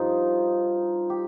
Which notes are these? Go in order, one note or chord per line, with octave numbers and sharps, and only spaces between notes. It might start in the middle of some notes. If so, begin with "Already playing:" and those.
Already playing: G2 F3 D#4 F4
G4